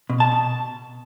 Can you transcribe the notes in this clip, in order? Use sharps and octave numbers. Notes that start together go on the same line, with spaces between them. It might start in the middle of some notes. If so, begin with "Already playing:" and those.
B2
A5
B2